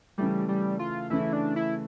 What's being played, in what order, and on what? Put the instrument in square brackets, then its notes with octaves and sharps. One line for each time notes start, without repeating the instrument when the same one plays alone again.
[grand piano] C#3 E3 A3 [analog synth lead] G3
[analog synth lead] G3
F4
[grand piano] C#3 E3 A3 [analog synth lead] E4
[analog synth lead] D4
E4